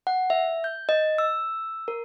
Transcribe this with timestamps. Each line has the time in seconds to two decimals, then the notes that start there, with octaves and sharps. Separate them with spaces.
0.07 F#5
0.30 E5
0.64 G6
0.89 D#5
1.18 E6
1.88 A#4